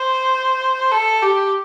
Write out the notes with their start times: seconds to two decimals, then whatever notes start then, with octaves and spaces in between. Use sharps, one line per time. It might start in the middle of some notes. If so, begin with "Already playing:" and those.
Already playing: C5
0.92 A4
1.22 G4